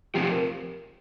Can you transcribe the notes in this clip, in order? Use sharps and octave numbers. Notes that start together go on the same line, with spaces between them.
F2 C3 F3 G4
A#4